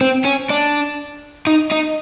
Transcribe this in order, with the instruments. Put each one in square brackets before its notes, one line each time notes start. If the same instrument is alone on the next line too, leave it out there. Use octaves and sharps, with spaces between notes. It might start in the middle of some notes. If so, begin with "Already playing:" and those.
[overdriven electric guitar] C4
C#4
D4
D#4
D#4